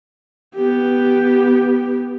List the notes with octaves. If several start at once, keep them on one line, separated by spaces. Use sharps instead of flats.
B3 G4